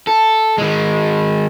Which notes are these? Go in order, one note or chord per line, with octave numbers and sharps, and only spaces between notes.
A4
D#3 G#3